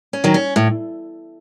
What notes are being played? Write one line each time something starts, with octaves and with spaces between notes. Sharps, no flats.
C#4
D#3 F#3
C#4
A2